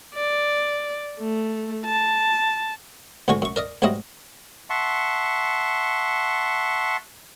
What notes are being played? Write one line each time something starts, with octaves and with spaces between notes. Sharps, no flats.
D5
A3
A5
B1 G#2 D3 F#4 G#5 C#6
F#2 C#6
A#4 D5 D#5
B1 G#2 F#3 G3 E4 D#5
E5 F#5 A5 C6 C#6